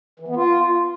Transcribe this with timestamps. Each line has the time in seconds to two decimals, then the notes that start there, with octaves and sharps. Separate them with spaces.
0.20 E3
0.28 B3
0.36 F4